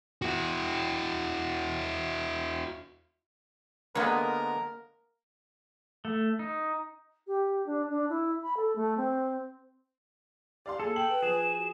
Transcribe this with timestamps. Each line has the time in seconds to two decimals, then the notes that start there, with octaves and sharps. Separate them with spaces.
0.22 E4 F#4
3.95 D3 G#3 A#3 B3 A#4 C#5
6.05 A3
6.39 D#4
7.27 G4
7.66 D4
7.90 D4
8.09 E4
8.43 B5
8.57 A4
8.75 A3
8.97 C4
10.66 G4 D5 F5 C6
10.80 A#3 G#4 A4
10.96 G5 F#7
11.08 B4
11.23 F3 G#4 E7
11.57 F#4